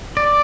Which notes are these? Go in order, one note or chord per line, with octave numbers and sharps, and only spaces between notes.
D5